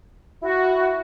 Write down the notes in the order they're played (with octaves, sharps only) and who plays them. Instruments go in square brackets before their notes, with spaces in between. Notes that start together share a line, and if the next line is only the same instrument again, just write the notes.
[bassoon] E4 [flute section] F#4